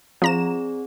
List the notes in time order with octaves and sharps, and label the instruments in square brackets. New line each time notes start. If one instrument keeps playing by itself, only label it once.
[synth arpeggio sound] F3 A#5 E7 [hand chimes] C4 G#4 D5